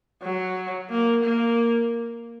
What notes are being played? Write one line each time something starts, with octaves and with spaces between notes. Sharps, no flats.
F#3
A#3
A#3